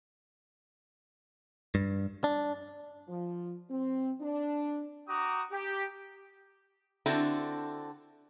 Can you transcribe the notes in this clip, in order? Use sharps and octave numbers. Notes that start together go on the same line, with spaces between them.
G2
D4
F3
C4
D4
F#4 G5 A#5 D6 D#6
G4
D3 C4 D4 E4 F#4 A4